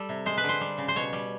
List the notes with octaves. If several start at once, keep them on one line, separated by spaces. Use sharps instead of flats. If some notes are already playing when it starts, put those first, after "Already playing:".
Already playing: G3 A4
C3
G#3 C5
B4
D3 C5
G3
C#3
C5
B2 C#5
G3